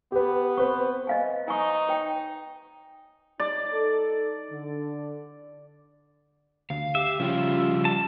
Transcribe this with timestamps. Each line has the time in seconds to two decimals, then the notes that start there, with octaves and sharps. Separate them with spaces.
0.12 B3 G4 B4
0.57 C4 B4 C5 C#6
1.07 D#5 F5 G#5
1.48 D#4 G#5 C#6
1.89 C#5 G5
3.40 D#4 D5
3.71 D#4 A4
4.50 D3
6.70 D2 F5
6.95 G4 E5
7.20 C#3 F3 G3 F4 G4
7.85 A5